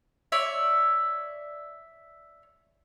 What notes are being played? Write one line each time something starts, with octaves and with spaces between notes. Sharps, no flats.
C#5 D5 E5